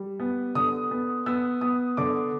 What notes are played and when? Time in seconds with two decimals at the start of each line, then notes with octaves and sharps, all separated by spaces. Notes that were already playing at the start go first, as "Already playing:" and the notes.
Already playing: G3
0.20 B3
0.55 D3 D#6
0.91 B3
1.26 B3 E6
1.61 B3 D#6
1.97 D3 D6